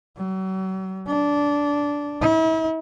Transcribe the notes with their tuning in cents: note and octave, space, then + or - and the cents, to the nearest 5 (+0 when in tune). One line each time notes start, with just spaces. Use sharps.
F#3 +40
D4 -15
E4 -40